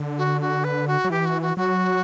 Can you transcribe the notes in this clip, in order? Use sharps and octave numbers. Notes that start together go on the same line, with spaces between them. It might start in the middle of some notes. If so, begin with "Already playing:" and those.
Already playing: D3
F#4
F#4
B4
F#4
F#3
E3 G4
F#4
F#4
F#3 F#4